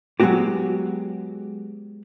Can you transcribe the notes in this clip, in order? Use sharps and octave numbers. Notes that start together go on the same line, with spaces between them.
F#3 G#3 A#3 B3 F#4 G4